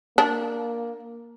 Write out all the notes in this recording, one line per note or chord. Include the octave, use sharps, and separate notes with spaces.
A#3 D4